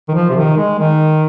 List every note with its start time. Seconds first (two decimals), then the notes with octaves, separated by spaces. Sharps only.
0.08 D#3
0.14 F3
0.30 C3
0.36 D#3
0.57 G#3
0.79 D#3